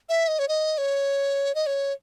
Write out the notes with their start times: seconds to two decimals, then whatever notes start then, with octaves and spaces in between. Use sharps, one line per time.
0.09 E5
0.28 D#5
0.39 C#5
0.48 D#5
0.78 C#5
1.55 D#5
1.66 C#5